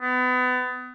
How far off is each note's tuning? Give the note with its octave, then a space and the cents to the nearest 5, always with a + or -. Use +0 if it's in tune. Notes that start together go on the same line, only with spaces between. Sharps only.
B3 +30